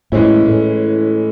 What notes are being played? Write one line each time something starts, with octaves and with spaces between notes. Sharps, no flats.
A2 E3 G#3 C#4 E4
A2